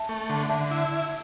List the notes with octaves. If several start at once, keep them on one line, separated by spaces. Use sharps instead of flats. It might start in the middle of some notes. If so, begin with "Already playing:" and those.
Already playing: E5 A5
A3
D3
D3 E5 A5
E4